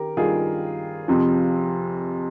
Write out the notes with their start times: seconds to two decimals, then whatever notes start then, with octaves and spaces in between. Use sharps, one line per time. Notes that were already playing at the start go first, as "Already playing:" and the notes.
Already playing: D#3 G4 A#4
0.17 G2 D#3 F4 G#4
1.08 F2 C3 F3